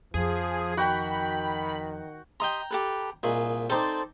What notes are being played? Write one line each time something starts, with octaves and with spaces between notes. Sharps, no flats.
F2 F3 G#4
D#3 F#4 G5 B5
G4 D#5 G5 A#5 C6
G4 A4 B4
C2 A#2 G#4 D#5
C4 D#4 A4 C5 D5